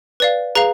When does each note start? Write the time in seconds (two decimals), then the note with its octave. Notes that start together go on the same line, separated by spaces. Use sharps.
0.20 B4 D5 F5
0.55 G#4 B4 F5 A#5